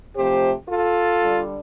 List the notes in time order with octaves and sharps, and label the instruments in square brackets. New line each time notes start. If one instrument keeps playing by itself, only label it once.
[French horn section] F2 C3 F3 A3 G4 C5
F4 A4
D3 G3 D4